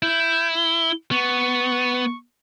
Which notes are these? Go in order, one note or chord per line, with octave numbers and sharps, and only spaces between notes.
E4 G6
G7
B3 C#6